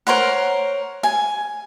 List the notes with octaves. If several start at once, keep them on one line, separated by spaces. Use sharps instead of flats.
A#4 C5 C#5 F#5
G#5